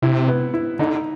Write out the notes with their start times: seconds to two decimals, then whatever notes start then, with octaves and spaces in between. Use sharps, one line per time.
0.02 C3 E4
0.28 B3
0.54 E4
0.79 D3 D#4